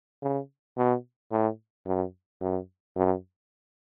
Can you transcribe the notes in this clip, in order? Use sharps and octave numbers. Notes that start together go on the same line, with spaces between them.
C#3
B2
A2
F#2
F#2
F#2